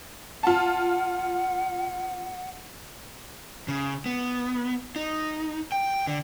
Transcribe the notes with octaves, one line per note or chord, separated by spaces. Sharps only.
F4 F#5 A5
C#3
B3
D#4
G5
D3